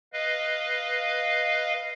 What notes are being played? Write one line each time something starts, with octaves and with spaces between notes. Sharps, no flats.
B4 D#5 F5